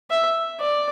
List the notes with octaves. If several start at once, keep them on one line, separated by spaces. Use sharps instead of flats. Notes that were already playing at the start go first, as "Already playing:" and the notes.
E5
D5